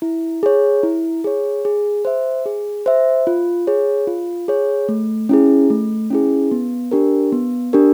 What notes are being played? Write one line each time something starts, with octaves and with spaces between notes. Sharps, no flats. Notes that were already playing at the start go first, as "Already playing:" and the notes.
E4
G#4 C#5
E4
G#4 C#5
G#4
C5 E5
G#4
C5 E5
F4
G#4 C#5
F4
G#4 C#5
A3
C#4 E4 G#4
A3
C#4 E4 G#4
B3
D4 G4 A#4
B3
D4 G4 A#4